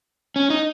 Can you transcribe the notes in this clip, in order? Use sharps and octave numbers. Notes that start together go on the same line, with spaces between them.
C#4
D#4